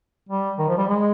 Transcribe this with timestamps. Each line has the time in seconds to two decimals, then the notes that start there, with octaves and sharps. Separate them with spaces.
0.29 G3
0.58 D#3
0.68 F3
0.78 G3
0.88 G#3